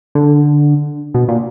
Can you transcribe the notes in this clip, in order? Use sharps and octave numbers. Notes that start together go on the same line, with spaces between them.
D3
B2
A#2